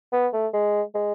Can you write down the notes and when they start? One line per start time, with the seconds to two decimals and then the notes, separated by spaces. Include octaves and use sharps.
0.13 B3
0.33 A3
0.53 G#3
0.94 G#3